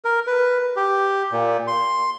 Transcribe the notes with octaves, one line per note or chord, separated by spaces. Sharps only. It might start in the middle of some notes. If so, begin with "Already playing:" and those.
A#4
B4
G4
A#2
C6